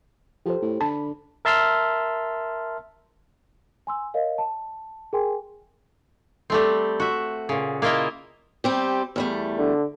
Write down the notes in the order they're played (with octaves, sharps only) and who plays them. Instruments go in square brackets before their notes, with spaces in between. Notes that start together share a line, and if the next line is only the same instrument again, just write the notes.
[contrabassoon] F3 [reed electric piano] G4 A4 C5
[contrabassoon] A2
[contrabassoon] D3 [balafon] A5 [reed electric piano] B5
[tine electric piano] A#4 E5 A5 C6 E6 F6
[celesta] G#5 C6 E6
A#4 C#5 D#5 F5
A5
G#4 A#4 G5 G#5 C6
[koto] G3 A3 C4
F#4 E5
A#2 C#3
A#3 E4 F4 D#5 E5 G5
[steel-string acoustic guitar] G3 C4 G4
E2 G3 A3
[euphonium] D3